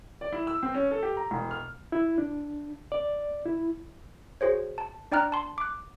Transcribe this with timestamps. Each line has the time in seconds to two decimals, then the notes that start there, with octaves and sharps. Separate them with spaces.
0.21 D5
0.32 E4
0.47 E6
0.63 C4
0.74 C#4
0.91 A4
1.03 G4
1.17 A#5
1.31 E1
1.51 F6
1.92 E4
2.18 D4
2.92 D5
3.45 E4
4.41 F#4 G#4 C5 C#5
4.78 A5
5.12 D4 D5 G5 A#5 F6 F#6
5.32 A5 C6
5.58 D6 F#6